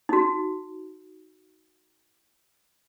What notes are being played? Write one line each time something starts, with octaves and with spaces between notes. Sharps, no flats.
D#4 F#4